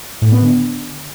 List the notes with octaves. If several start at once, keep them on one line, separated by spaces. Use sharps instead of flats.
A2
B3
D3